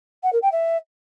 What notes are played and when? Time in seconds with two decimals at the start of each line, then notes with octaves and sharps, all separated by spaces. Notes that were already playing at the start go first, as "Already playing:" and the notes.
0.23 F#5
0.32 A#4
0.42 G5
0.52 E5